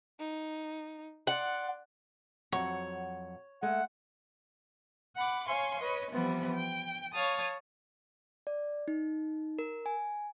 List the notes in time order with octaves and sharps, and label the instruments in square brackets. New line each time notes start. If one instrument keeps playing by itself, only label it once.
[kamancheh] D#4
[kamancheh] D5 C6 [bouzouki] F#5
[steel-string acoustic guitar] F2 F#3 F#5 [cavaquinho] C#5
[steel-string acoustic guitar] G#3 A3 [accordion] F#5
[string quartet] F#5 B5 D6
C#5 F5 G#5 C6 C#6
B4 C#5 D#5
E3 F3 G3 B3 C4
G5
C#5 F5 A5 D#6
[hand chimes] D5
D#4
A#4
G#5